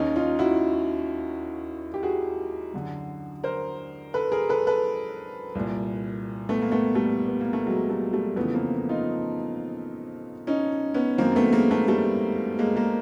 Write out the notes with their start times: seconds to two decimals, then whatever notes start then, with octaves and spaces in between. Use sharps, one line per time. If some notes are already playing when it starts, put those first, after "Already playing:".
Already playing: D#2 D#3 C#4 D#4
0.16 D#4 F4
0.39 E4 F#4
1.94 G4
2.03 F#4 G#4
2.73 F#2 D3
3.44 A#4 C5
4.14 A4 B4
4.32 G#4 A#4
4.49 A4 B4
4.67 A4 B4
5.55 C2 A#2
6.49 A3 B3
6.62 A#3
6.72 A3 B3
6.95 G3 A3
7.28 B3
7.41 A#3
7.53 A3
7.66 F#3 G#3
7.90 G3 A3
8.13 G3 A3
8.36 F2 C#3 E3 A3 B3
8.54 A#3 C4
8.89 D#4 F4
10.47 C#4 D#4
10.94 B3 C#4
11.18 F#2 D#3 A#3 C4
11.36 A3 B3
11.53 G#3 A#3
11.71 A3 B3
11.88 G3 A3
12.59 G#3 A#3
12.76 G#3 A#3